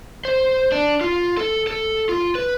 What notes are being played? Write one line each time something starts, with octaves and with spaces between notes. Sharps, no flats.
C5
D4
F4
A4
A4
F4
B4